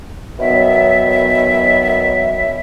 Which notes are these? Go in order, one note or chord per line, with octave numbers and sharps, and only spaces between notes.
F#2 B2 D#3 F#3 B3 E5